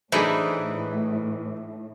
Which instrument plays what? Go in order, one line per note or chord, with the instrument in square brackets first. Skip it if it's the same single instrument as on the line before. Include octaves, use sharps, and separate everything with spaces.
[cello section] A2 [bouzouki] E3 [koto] D4 D#4 B4 [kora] G#4 A4 C5